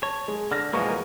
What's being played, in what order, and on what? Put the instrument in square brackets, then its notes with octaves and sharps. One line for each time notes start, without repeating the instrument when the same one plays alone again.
[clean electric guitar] C#5 [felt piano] A5
[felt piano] G#3
[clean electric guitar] D3 [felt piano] F6 A#6
[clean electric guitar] E2 B2 F3 [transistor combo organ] G#3 A#3 [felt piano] B4 A#5 C#6